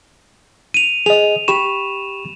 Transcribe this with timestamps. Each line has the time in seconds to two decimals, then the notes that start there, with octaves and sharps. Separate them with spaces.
0.74 D#7 F7
1.06 G#4 D#5 F7
1.48 G4 B5 C#6 E7